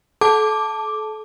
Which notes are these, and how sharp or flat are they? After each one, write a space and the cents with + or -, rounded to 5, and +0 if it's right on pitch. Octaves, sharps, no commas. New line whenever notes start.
A4 -35 A5 +0 D6 +0